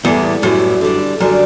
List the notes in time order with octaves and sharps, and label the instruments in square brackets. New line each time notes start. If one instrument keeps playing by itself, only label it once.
[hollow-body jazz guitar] E2 [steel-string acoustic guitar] A2 G3 B3 E4
[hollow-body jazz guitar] F#2 [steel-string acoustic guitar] A2 G3 B3 E4
[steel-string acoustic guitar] D3 G3 D4
[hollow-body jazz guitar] F#2 [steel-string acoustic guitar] D3 G3 D4